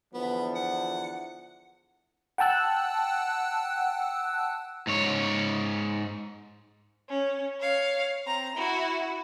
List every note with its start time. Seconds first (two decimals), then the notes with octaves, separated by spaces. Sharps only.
0.14 E2 D3 F3 B3
0.55 F#5
2.38 F#5 G5 A5 E6 F#6
4.87 G#2 C#5
7.09 C#4
7.60 C#5 F5
8.26 C4 A#5
8.56 E4 F#4